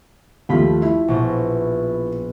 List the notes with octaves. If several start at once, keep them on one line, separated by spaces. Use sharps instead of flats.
D#2 F3 A3 F4 B5 B6
E4
A#1 B2